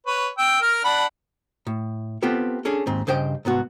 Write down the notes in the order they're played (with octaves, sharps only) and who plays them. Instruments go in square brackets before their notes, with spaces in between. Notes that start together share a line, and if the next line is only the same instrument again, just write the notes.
[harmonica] B4 C#5
G5 E6
A#4 F6
D4 F#5 B5
[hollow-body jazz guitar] A2
B3 C4 F4 G4 A4
C#4 D4 G#4 A4
D#2 G#2 C4
G2 C#3 C5 D#5 G5
C2 G#2 B3 F#4